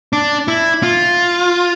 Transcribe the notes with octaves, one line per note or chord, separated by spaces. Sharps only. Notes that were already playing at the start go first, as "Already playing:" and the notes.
D4
E4
F4